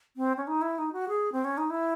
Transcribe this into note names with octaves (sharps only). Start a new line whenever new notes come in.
C4
C#4
D#4
E4
D#4
F#4
G#4
C4
C#4
D#4
E4